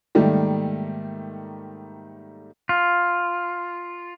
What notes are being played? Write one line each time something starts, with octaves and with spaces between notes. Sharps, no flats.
G#2 D#3 G3 A3 A#3 G4
F4